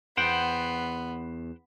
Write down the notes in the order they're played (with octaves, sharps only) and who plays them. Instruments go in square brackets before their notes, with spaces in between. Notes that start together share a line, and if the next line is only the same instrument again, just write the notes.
[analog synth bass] E2 [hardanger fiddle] B3 [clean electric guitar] C5 F#5 G5